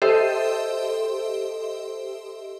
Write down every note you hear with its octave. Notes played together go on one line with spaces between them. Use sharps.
G4 A4 C5 D#5 E5 C6